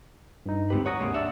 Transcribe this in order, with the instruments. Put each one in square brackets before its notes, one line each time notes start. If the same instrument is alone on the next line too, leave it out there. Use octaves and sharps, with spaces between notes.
[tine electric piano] G2 D#4
[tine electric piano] D2 G#2 G4 [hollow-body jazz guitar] C4 B4
[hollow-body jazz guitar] C#5 A#5 [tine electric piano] F#5 D#6
[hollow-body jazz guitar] C3 G#3 A#3
[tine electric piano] D4 D5 [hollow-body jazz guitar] E5 F#5